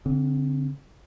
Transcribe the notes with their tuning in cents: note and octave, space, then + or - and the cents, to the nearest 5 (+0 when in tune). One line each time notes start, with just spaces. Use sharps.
D3 -35 C4 +0